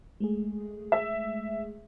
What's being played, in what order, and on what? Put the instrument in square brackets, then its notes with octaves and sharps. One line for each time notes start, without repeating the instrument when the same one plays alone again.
[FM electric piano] G#3 A3 G#4
[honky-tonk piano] E5